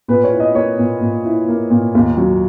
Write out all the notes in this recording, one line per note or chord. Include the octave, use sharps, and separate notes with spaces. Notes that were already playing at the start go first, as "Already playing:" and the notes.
A#2 B4
C#5
E4
D#5
A#3 C#5
A#2
A#2
E4
A#3
A#2
D#2
F#3